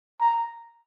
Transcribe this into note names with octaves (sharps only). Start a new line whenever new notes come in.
A#5